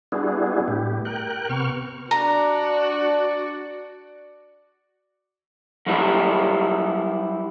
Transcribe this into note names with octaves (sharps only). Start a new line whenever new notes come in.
G3 B3 D4 E4 F#4 G#4
A2 G4
A#4 G5 F#6
C3 B3 C#6 F6
D4 F#4 D5 A#5
F#3 G3 E4 F4 G4